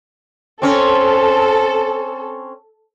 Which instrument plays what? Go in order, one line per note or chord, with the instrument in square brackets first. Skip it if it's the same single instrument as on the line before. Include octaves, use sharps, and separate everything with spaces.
[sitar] C4 C#4 [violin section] A4